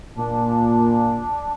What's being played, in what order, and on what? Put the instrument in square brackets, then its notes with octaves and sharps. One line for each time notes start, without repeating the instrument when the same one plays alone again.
[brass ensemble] A#2 [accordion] D4